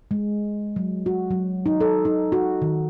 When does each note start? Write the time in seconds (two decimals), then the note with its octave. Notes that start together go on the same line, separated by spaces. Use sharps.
0.11 G#3
0.76 F#3
1.06 F#4
1.31 F#3
1.66 D#4
1.81 A4
2.05 D#4
2.32 F#4
2.62 D#3